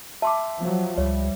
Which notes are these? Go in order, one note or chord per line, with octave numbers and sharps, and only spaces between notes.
E5 A5 C6 D6
F3 F#3
C#2 G3 C#5